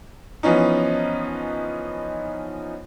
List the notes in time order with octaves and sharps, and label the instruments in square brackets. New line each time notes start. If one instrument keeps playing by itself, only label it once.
[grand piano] E3 F3 B3 C#4 D#4